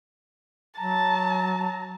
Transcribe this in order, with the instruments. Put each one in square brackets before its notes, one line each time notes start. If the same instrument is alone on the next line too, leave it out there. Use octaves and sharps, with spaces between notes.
[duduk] F#3 [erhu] A5 [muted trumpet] A#5